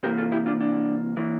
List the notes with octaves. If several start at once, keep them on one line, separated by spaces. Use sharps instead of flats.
C3 E3 A#3 G4 A#4
F4 A4
E4 G4
D4 F4
D4
E3 A#3